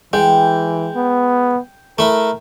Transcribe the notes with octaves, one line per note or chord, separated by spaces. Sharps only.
E3 G#3 G5
B3
A3 E4 A#4